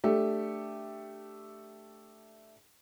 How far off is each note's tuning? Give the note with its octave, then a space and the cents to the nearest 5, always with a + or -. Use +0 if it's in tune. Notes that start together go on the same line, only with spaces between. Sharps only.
A3 +0 D4 +0 G4 +0